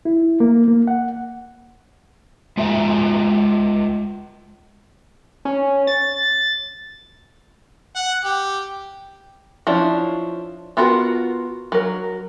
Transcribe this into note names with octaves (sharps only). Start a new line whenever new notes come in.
E4
A#3
A#3
F#5
G#3 F4 E5 F5 G5 A#5
C#4
A6
F#5
G4
F3 C#4 D4 E4
B3 F4 F#4 A4 A#4
F#3 A#4